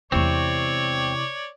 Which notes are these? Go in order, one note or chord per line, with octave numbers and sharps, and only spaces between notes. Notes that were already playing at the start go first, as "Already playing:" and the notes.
E2 C3 G#3 C4 E4 C#5 D5 C#6